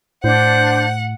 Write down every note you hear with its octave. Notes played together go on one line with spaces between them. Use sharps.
A2 D4 C5 F#5 G6